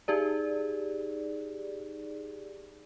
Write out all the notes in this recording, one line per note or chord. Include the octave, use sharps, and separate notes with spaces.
D#4 G4 G#4 D5